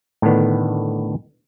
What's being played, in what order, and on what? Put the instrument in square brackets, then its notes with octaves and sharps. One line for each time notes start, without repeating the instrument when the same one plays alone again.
[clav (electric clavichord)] A2 D3 D#3 B3 D4